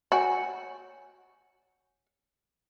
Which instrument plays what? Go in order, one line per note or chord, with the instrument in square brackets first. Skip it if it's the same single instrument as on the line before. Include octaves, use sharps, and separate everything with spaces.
[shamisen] F#4 [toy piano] C#5 G#5